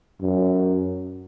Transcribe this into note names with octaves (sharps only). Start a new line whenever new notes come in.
F#2